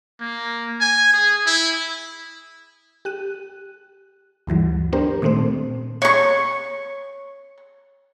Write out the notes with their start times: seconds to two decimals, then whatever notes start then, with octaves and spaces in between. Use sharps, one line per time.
0.20 A#3
0.81 G#5
1.13 G#4
1.46 E4
3.05 G4 F#6 D#7
4.47 D2 G2 E3 F#3
4.93 B3 D4 G4 A#4 C5
5.22 A#2 D#3 A3 C4 C5
6.02 C#5 C#6